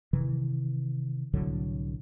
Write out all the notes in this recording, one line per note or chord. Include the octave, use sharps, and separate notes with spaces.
C3 D#3 E3
C2 A2 D3 F#3